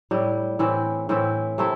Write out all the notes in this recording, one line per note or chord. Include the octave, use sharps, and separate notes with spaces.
A2 G3 E4
A2 E3 C4 E4
A2 E3 C4 E4
C3 A3 E4